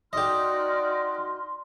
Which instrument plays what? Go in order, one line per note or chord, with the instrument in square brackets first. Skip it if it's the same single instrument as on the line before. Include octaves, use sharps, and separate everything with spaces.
[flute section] D#4 F#4 F6 [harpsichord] G4 D#5 [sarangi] D5 [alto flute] C6